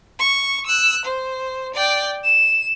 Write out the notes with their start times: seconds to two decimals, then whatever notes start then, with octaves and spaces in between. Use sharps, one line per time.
0.20 C#6
0.66 E6 F#6
1.05 C5
1.74 D5 G5
2.24 E7